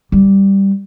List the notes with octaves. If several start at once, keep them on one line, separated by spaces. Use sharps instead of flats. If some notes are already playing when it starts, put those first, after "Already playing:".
G3